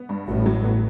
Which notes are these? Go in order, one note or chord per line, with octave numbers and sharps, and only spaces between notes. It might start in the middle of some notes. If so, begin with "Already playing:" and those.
Already playing: B3
G2
A1 A2 F#4
F#3
B3